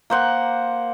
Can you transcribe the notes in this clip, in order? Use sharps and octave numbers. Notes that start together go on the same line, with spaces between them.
A#3 C5 F#5